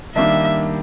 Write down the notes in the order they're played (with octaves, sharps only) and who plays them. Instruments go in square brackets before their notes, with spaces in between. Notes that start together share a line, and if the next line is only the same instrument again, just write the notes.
[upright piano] D#3 G3 A#3 D4 [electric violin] E5